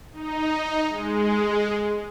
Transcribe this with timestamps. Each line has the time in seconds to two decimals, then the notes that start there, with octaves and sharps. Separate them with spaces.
0.13 D#4
0.89 G#3